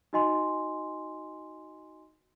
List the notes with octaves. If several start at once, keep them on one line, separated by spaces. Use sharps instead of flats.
D#4 F#4 D#5 G#5 C6